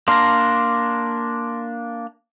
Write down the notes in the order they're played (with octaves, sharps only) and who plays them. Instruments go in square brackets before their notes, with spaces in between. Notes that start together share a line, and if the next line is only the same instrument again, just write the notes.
[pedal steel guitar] A#3 D4 [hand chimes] C6 F6 A#6